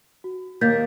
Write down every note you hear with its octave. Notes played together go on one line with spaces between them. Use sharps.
F#4
D#2 A#3 G6 A6 B6